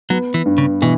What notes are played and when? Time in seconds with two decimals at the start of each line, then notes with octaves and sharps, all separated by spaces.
0.10 F#3 B3
0.34 E3
0.45 G2
0.58 C#3
0.82 B2 E3